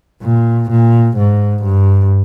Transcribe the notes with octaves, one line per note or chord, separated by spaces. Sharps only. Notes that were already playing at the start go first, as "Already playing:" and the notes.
A#2
A#2
G#2
G2